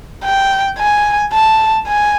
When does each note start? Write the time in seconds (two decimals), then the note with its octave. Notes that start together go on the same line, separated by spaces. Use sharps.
0.24 G5
0.79 G#5
1.33 A5
1.87 G#5